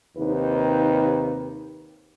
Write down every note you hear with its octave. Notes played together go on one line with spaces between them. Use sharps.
D#2 C3 D#4 B4